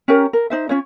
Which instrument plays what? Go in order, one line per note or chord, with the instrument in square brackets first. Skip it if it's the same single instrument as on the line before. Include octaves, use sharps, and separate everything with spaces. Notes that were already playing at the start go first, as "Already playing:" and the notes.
[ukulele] C#4 G4 A#4 A#5
A#4
D#4 C5 E5
C#4 F4 C#5